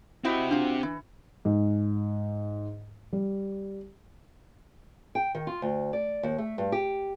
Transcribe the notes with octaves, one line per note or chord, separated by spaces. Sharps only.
C4 D#4 E4 F#4 G4
D4 F4 F#4
E3
G#2
G3
G5
D#3
F4
D2
D5
D#2
A3
G2
G4